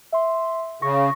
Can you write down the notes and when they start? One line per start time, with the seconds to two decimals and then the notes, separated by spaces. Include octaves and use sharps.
0.12 E5 C6
0.82 C#3 C#6 A#6